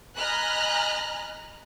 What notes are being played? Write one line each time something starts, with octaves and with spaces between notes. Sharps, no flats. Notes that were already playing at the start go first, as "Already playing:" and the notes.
D#5 G#5 A#5 B5 F6 F#6